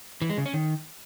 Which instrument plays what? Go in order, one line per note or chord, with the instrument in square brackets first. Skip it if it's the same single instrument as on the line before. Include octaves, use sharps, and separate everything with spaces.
[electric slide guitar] E3
G#3
C#3
C#4
D#3